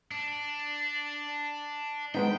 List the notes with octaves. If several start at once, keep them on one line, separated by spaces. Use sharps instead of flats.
D4
G#3 B3 D#4 G5